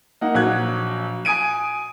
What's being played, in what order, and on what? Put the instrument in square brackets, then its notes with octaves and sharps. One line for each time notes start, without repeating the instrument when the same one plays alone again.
[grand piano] A#3 D#4 F#5
A#1 F#3 F#6 G#6
G#5 D#6 G#6 D7 D#7